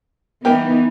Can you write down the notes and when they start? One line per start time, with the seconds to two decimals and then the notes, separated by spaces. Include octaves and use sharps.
0.45 E3 B3 D#4 G4 A#4 G#5